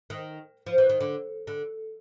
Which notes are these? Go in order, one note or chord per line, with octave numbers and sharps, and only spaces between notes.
D#3
F3
E3
D#3
D3
D3